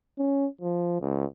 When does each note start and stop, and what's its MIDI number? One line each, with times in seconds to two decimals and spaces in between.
0.19 0.46 61
0.61 0.96 53
1.01 1.25 37